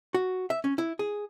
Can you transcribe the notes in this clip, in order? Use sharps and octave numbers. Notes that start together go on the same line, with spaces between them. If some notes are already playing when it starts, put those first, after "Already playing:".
F#4
E5
C#4
E4
G#4